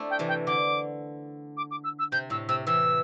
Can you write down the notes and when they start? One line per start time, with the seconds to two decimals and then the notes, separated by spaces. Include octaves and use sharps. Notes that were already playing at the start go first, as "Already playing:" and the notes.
Already playing: A3 C4 D4 E4
0.10 G5
0.19 C3 E3
0.28 G5
0.47 D3 D6
1.57 D6
1.71 D6
1.84 E6
1.99 E6
2.12 C3 G6
2.30 A2 E6
2.48 C3 E6
2.67 C3 E3 E6